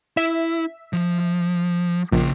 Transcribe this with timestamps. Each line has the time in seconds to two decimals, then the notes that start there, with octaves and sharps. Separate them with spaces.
0.17 E4 E5
0.93 F3
2.12 A#1 C#3 G5